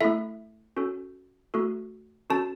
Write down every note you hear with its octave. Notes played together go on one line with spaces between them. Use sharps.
A3 E4 A4 E5
C#4 F#4 A4
A3 F#4 A4
C#4 F#4 A4 A5